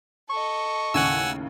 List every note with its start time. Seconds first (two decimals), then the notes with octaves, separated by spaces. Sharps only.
0.30 A4 D#5 C#6
0.94 D#2 A2 C#3 F#5 G#5 E6